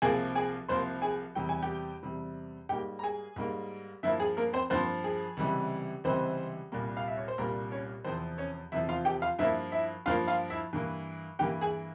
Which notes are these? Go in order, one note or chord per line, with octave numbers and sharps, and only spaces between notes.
C2 C3 F3 A#3 G#4 G#5
G#4 G#5
C2 C3 F3 A#3 C5 C6
G#4 G#5
E2 C3 G3 G5
G#5
G4 G5
E2 C3 G3
G#2 G3 A#3 G4 G5
A#5
G#4 G#5
G#2 G3 A#3
G2 F3 A#3 E4 E5
G#4
A#3 A#4
C4 C5
G2 F3 A#3 C4 C5
G#4
C#2 C3 E3 G3
C#2 C3 E3 G3 C4 C5
C2 A#2 G3 A#3
F5
E5
C#5
C5
C2 A#2 G3 A#3 A#4
C#4 C#5
E2 C3 F3 C4 C5
C#4 C#5
E2 C3 F3 E4 E5
F4 F5
G4 G5
F4 F5
G2 F3 A#3 E4 E5
E4 E5
G2 F3 A#3 F4 F5
F4 F5
E4 E5
G2 E3 A#3
G2 E3 A#3 G4 G5
G#4 G#5